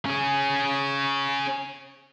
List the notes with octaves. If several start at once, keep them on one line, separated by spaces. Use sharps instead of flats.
C#4 G#4